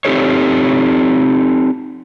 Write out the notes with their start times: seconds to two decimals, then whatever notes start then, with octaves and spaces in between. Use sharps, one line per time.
0.05 C4 D#4 G4 A4 C#5